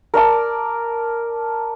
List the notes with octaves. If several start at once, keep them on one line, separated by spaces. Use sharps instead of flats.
A#4 D5 A5 D6